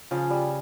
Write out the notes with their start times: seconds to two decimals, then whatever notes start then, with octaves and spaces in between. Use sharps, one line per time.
0.11 C#3 F3
0.30 G3